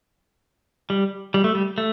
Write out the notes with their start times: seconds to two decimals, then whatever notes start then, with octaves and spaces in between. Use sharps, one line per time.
0.90 G3
1.34 G3
1.44 A3
1.55 G3
1.78 A3